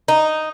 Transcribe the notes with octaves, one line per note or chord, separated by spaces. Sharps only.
D#4